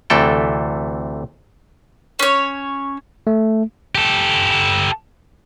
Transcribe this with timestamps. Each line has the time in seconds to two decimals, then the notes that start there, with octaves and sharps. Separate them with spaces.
0.10 D2 C3 E3 A3 A4 G5
2.19 C#4 C#5
3.27 A3
3.95 G4 A4